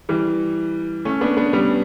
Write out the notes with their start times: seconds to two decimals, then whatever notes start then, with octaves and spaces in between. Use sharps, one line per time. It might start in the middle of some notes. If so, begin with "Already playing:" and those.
0.09 E3 G3
1.05 A3 C#4
1.21 B3 D4
1.37 B3 D4
1.53 G3 B3